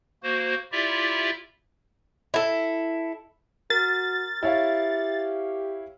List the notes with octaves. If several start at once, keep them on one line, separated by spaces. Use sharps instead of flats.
A#3 F#4 C5
E4 F4 G4 D5 E5
E4 A4
F#4 A#4 A6
E4 G4 C#5 F5